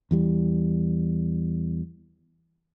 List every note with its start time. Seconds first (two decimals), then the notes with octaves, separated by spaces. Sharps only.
0.11 E2 E3 G3